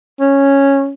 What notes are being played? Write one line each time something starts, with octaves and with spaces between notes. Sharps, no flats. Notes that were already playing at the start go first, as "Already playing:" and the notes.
C#4